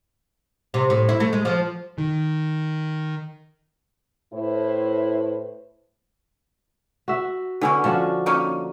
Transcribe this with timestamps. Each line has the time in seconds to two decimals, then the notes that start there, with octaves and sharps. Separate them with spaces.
0.74 C3
0.90 A2
1.09 E4
1.20 A3
1.33 G#3
1.45 F3
1.98 D#3
4.33 A2 E4 B4 C5
7.08 F#4 E5
7.61 D3 B3 C#4 E4 F#4
7.84 F3 C#4 D4 F#4
8.26 A#3 C#4 D#4